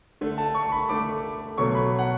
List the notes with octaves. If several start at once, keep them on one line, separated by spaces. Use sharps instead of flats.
D3 A3
A5
C#6
B5
D3 A3 D6
B2 F#3 A3 C#6
B5
F#5